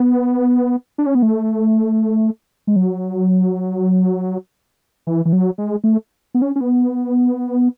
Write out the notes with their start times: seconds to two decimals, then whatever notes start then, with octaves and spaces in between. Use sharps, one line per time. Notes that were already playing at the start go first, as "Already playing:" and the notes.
Already playing: B3
0.98 D4
1.06 C#4
1.15 B3
1.22 A3
2.67 G#3
2.76 F#3
5.07 E3
5.25 E3
5.33 F#3
5.58 G#3
5.84 A3
6.34 B3
6.42 C#4
6.56 C#4
6.61 B3